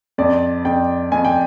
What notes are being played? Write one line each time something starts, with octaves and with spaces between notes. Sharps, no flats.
F2 D5
F2 G5
F2 G#5
G5